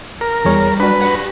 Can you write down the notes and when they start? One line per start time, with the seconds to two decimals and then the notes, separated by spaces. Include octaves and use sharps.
0.21 A#4
0.45 E2 G3 G#4 C#5
0.80 D4 F#4 B4
1.01 G4 F#5